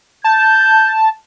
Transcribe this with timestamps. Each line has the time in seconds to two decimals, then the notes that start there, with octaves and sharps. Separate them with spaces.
0.24 A5 G6